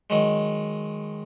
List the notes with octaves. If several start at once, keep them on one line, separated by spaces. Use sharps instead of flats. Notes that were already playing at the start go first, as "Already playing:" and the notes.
D#3 F#3 G#3